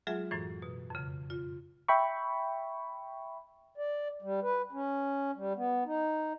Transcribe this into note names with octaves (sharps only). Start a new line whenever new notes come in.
F#3 G#3 F4 G#4 E5
F#2 A2 E3
B2
F2 C#3
F4
E5 G5 B5 C#6
D5
G3
B4
C#4
G3
B3
D#4